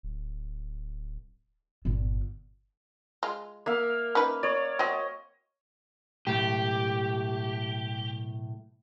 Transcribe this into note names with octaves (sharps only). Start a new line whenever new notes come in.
D1
G1 A#2 D3
G#3 F4
A#3 E5 F5
C#4 D#4 B4
C#5 D5
F#3 C4 D#5
B1 A2 G4